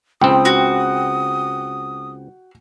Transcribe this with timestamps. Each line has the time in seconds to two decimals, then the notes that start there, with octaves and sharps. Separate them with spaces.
0.21 C#2 C4 G5 D#6
0.45 F#4